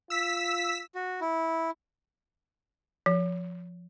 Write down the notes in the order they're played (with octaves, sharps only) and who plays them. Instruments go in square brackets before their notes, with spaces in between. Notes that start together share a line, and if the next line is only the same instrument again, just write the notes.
[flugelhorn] F4 [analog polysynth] E6 B6
[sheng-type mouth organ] F#4
E4
[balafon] F3